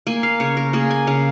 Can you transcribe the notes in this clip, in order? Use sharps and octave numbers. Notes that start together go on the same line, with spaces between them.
A#3 G#5
F5
C#3 C#5
A#4
A#3 G#4
G#5
C#3 F5